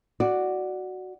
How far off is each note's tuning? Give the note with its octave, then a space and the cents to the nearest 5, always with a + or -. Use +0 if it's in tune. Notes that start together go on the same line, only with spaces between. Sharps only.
F#4 +0 D5 +5